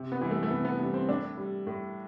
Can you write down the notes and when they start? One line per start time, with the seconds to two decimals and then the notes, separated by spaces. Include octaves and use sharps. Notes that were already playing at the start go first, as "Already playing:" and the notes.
Already playing: C3
0.12 B3
0.21 E3 G3
0.31 A3
0.43 A3
0.50 C3 B3
0.65 B3
0.80 E3 G3 B3
0.94 C4
1.09 A2 D4
1.37 G3
1.67 A2